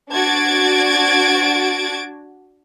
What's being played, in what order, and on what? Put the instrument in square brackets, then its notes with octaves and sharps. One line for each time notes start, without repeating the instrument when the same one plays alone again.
[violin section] D4 F#4 G#6 A6 D7